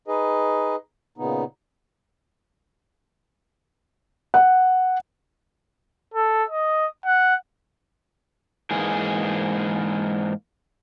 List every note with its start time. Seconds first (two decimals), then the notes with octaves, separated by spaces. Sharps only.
0.08 D#4 G#4 B4 D#5
1.18 A#2 C#3 B3 D#4
4.34 F#5
6.14 A4
6.49 D#5
7.06 F#5
8.71 G#2 E3 A#3 G#4